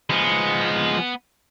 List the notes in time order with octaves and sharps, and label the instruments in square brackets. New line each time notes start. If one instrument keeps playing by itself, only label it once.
[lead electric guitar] F3 G#3 [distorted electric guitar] B3